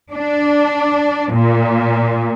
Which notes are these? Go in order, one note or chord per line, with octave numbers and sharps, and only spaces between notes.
D4
A#2